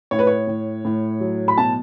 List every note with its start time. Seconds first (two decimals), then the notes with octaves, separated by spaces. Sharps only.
0.11 A2 C#5
0.19 B4
0.27 C#5
0.47 A2
0.85 A2
1.21 F#3
1.48 B5
1.58 B2 A5